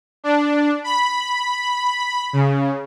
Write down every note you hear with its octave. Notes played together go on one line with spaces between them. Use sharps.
D4
B5
C#3